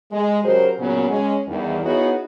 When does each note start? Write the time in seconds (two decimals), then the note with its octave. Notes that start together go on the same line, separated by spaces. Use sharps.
0.11 G#3
0.43 C#3 F#3 F#4 G4 A#4 C5
0.79 A#2 C#3 F#3 B3
1.09 G#3 C#4
1.47 E2 G2 D#3
1.84 B3 D#4 E4 F#4 G#4 C#5